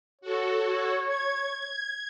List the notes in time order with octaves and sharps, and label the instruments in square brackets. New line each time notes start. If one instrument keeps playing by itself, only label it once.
[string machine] F#4 A4 [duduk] C#5
[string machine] G#6